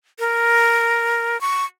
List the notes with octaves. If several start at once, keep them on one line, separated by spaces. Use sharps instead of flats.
A#4
C#6